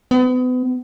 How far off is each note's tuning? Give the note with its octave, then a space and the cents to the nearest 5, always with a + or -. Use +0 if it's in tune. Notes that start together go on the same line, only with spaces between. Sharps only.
B3 +35